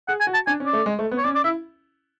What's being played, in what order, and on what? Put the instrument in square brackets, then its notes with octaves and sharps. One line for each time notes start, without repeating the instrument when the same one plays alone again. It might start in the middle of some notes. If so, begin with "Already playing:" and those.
[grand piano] G#4 [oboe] F#5
[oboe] G#5
[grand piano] F#4
[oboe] A5
[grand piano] D4 [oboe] G#5
[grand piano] C#4
[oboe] D5
[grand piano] A3
G#3
A3
B3
[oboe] C#5
[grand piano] C#4 [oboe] D5
[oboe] D5
[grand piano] E4 [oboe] E5